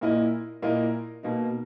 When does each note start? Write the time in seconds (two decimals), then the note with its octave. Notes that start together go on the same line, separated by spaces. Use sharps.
0.01 A#2 A#3 E4 A#4 D#5
0.62 A#2 A#3 E4 A#4 D#5
1.23 B2 A#3 D#4